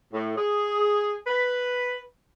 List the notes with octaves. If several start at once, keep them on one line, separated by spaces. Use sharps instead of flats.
A2
G#4
B4